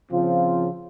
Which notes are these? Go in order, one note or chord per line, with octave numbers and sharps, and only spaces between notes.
C#3 F3 C4 F4